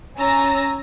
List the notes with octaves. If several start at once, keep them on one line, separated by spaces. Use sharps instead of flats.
C#4 G#5 A#5 E6 A6 A#6